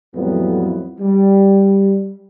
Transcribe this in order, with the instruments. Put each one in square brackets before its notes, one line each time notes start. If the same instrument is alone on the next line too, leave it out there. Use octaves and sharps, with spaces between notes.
[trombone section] F2 A2 E3 F#3 G3 B3
G3